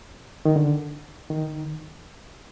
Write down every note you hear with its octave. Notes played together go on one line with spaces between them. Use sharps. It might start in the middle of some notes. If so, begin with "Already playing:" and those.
D#3
D3
D#3